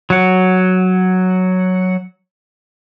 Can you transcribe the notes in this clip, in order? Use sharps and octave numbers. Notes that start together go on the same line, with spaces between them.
F#3 F#5